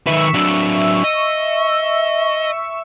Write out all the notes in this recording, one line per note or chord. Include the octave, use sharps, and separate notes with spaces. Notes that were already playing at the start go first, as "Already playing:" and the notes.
D#3 B4 E5 C#6 E6
F#3 D4
D#5